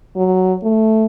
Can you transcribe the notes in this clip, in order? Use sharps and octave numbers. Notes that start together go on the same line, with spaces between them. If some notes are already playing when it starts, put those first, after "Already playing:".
F#3
A3